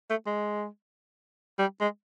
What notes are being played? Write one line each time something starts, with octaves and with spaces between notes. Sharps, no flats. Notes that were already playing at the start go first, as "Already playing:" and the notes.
A3
G#3
G3
G#3